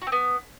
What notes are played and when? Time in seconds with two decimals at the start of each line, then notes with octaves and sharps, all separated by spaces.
0.02 F#4
0.07 C4
0.12 B3